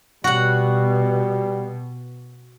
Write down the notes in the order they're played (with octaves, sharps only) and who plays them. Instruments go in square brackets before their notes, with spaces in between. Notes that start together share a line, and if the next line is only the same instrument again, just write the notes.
[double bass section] B2 [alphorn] G3 [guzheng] F#4 F#5